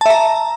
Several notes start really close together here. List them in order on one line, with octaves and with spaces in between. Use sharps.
A5 E5 A#5